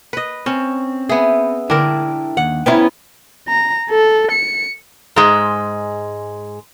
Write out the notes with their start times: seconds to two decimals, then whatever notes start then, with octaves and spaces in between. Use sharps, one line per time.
0.13 B4 D#5
0.46 C4 C#4
1.09 B3 G#4 E5 B5
1.70 D3 D4 E4 A#4 G5 A5
2.37 D#2 F#5
2.66 B3 C#4 E4 C#5 G5 A#5 F6 A6
3.49 A#5
3.90 A4
4.32 C#7
5.16 G#2 G#3